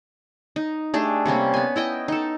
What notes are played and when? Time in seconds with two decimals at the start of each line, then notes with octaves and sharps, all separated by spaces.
0.56 D#4
0.94 A3 D4 G4 G#4
1.26 C3 G3 A#3 C#4
1.54 B3 G#5
1.76 E4 D#5 G5
2.08 D#4 A4